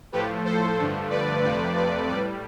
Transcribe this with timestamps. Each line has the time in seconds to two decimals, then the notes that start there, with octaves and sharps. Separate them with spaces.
0.12 A2 F3 A3 G4 B4
0.45 A4 C5
0.78 G2 D3 F3 A3
1.10 B4 D5
1.43 F2 C3 F3 A3 B4 D5
1.76 B4 D5
2.08 A2 G3 B4 D5